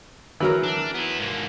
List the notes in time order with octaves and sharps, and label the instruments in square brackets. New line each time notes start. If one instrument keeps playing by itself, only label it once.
[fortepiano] E3 F#3 A#4
[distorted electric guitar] D4
B3 E4
G#2 A#3